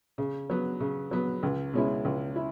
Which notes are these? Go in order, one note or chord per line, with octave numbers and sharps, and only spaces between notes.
C#3
F#3 B3
C#3
F#3 B3
C#2
B2 G#3 C#4 E4
C#2
E4